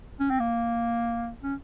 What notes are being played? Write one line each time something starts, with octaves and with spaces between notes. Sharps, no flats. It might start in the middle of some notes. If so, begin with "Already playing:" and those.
C#4
C4
A#3
C#4